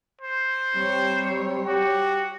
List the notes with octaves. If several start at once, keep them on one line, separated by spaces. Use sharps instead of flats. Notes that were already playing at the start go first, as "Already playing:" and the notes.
C5
C3 G3 C4 C#5
F#4 G4